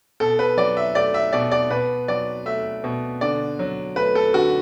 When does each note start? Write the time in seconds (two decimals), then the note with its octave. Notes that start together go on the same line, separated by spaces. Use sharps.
0.20 B2 A4
0.39 B4
0.57 F#3 D5
0.77 E5
0.95 A3 D5
1.14 E5
1.33 B2 D5
1.52 D5
1.70 B2 B4
2.08 F#3 D5
2.46 A3 E5
2.84 B2
3.21 D3 D5
3.59 F#3
3.96 A3 B4
4.15 A4
4.34 D3 F#4